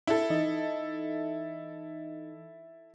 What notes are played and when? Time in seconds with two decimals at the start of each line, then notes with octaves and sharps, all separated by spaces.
0.07 E4 A4
0.30 E3 D#4 D#5